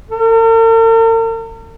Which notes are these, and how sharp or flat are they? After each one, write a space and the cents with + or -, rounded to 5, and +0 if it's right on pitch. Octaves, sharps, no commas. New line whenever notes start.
A#4 -45